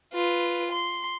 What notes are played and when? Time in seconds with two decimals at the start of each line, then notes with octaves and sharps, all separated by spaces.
0.13 F4 B4
0.71 C6